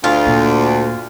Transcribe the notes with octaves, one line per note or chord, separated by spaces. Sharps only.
D2 F4
A#2